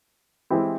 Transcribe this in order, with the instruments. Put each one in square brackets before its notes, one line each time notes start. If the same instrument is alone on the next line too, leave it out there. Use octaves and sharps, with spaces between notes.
[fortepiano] E3 G#3 C4 E4 G4